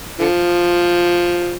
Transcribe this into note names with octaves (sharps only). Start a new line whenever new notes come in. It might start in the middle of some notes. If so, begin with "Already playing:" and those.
D3 F3